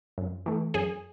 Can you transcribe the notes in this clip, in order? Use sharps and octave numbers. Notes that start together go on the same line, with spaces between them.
F#2
E3 A3
F#2 G#4